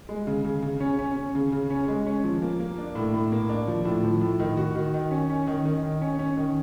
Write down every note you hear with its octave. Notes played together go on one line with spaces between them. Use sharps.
G#3
C#3
C#3
C#3
C#4
C#4
C#4
C#3
C#3
C#4
G#3
C#4
F3
A#3
A#3
D4
A2
A2
A#3
D4
F3
A2
F3
A2
D#3
F#4
D#3
D#3
C#4
C#4
D#3
D#3
D#3
C#4
C#4
D#3